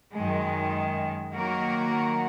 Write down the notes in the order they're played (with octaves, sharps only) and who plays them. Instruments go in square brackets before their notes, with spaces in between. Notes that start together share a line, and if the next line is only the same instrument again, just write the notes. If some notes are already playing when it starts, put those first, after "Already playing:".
[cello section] F#2 D#3 G#3
D#3 F#3 A#3 F#4 A#4